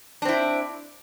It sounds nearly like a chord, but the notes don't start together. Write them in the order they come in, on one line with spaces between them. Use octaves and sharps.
D4 C4 E4